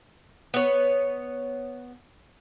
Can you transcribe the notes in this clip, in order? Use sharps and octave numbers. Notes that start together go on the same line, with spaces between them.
B3 C#5